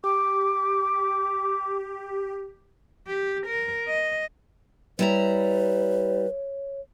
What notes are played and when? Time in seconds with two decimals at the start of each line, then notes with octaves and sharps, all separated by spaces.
0.04 G4 D6
3.07 G4
3.47 A#4
3.87 D#5
4.99 G3 E4 B4 C#5 A#5